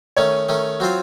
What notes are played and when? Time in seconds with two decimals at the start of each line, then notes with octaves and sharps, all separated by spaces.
0.17 D#3 A3 C#4 C#5
0.49 D#3 A3 C#4
0.80 F#3 C4 F4 C5